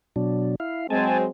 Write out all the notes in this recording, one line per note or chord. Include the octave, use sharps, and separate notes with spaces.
B2 F#3 D4
E4 F5
F#3 G#3 C4 G#5 A5